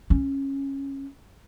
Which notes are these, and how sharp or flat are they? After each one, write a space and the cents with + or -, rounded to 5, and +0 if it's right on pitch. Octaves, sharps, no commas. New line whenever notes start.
C#4 -15